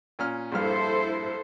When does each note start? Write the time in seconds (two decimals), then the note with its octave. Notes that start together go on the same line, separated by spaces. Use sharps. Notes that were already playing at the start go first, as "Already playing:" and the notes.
0.19 A#2 C#4 F6
0.52 A#1 G2 E4 A4 C5 F6